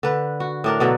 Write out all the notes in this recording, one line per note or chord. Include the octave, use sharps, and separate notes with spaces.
D3 B4
F#4
A2 D4 A#4
B2 D3 F#3